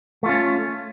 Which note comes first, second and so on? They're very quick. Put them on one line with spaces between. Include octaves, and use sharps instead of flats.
A3 F4 C#4